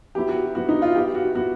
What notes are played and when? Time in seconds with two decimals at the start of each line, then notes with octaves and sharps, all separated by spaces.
0.15 F#3 B3 E4 G4
0.29 F#4
0.55 F#3 B3 E4 F#4
0.69 D#4
0.82 F4
0.95 F#3 B3 E4 G4
1.14 F#4
1.35 F#3 B3 E4 F#4